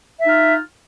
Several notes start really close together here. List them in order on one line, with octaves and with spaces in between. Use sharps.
E5 D#4 F4